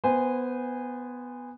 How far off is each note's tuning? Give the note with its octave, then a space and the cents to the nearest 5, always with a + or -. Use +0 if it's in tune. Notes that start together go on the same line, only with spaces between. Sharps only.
B3 +0 C5 -20 G#5 -20